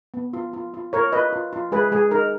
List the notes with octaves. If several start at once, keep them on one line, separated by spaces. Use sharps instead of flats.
B3
F4
F4
F4
F4 A#4 C#5
F4 B4 D#5
F4
F4
G#3 G#4 B4
G#3 G#4
D#4 A#4